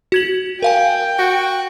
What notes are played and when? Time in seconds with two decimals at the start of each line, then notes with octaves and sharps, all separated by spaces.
0.12 F#4 G#6 F#7
0.62 A#4 F5 G5 G#5
1.19 F#4